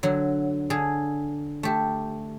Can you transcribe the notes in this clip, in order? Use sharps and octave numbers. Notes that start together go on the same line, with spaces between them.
D3 F#3
D3 G#4
A3 G4